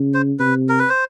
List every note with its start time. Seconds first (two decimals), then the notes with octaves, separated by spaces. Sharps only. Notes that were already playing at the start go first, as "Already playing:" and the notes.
Already playing: C#3
0.14 C5
0.39 C3 B4
0.69 A#4
0.79 B4
0.89 C5